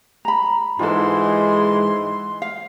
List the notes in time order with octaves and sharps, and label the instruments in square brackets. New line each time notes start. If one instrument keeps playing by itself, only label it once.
[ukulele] A#5 B5
[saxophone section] G#2 E3 G#3 [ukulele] F4 A4 [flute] C6
[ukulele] F5